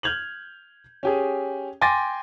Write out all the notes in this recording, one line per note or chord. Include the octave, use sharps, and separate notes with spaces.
F6 G6 G#6 F7 F#7
C#4 G4 G#4
G5 G#5 C6 D6 A6 A#6